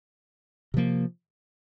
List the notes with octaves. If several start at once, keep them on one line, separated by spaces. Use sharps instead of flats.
C3 F3 A#3